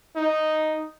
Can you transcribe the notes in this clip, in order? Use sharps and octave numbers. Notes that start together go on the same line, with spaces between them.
D#4